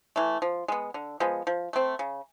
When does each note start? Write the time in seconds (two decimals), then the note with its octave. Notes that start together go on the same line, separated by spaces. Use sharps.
0.16 E3 A3
0.42 F3
0.68 G#3 B3
0.94 D3
1.20 F3 G#3 B3
1.47 F3
1.73 A3 C4
1.99 C#3